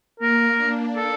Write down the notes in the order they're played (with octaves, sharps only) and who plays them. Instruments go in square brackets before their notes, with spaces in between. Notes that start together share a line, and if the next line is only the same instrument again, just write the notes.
[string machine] A#3 [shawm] A#4
[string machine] D4
[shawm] A4